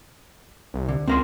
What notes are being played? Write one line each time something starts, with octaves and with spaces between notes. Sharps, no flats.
C2
D3
C#2 C4 A#4 C6